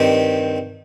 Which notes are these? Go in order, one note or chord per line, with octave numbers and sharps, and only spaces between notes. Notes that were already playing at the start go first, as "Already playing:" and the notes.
Already playing: G2 D#3 C4 G4